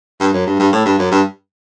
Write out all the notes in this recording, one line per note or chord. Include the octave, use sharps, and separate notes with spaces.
G2
F#2
G2
G2
A2
G2
F#2
G2